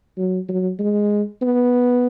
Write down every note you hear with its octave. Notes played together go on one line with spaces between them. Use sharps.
F#3
F#3
G#3
B3